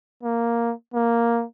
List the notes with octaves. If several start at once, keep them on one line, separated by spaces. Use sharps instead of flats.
A#3
A#3